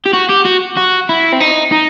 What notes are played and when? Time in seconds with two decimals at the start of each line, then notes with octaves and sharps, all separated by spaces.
0.06 G4
0.13 F#4
0.29 G4
0.45 F#4
0.77 F#4
1.09 E4
1.32 C4
1.41 D#4
1.72 D#4